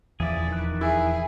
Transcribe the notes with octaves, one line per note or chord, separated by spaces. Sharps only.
D#1 E2 F3 E4 G#4 D5
D#3 F#6
E4 G#4